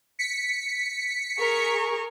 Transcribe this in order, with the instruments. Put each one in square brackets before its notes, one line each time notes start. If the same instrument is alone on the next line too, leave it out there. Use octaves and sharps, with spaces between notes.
[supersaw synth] B6 C#7
[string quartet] G#4 A#4 C#6